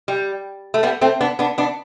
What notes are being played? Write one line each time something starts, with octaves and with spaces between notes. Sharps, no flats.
G3
A3
G3 B3
A3 C4
B3 D4
B3 D4
B3 D4